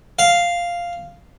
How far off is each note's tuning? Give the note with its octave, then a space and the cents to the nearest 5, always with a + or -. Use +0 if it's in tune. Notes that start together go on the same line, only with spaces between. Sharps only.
F5 -5